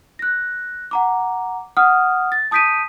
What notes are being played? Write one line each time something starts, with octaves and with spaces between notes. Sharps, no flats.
F#6 A#6
F#5 A#5 D6
F#5 D#6 F6
A6
A5 D#6 G6 B6 D7 D#7